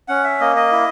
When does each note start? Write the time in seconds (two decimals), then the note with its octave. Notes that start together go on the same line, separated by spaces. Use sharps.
0.08 C#4 F#5
0.24 E5
0.40 A#3 D#5
0.56 D#5
0.72 E4